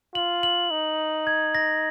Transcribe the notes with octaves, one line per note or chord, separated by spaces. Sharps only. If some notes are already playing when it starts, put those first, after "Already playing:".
F4 F#7
F#7
D#4
G#6
A#6